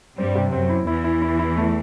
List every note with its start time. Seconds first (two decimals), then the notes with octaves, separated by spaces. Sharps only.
0.17 G2 G3 C4
0.35 C3
0.52 F#2 F#3 C4
0.69 E4
0.87 E2 E3 E4
1.04 E4
1.22 E4
1.39 E4
1.56 A3